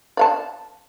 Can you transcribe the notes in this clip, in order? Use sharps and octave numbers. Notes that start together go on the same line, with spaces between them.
D5 F5 A5